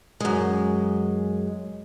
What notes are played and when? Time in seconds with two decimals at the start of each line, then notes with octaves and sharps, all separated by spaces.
0.20 F#2 G#3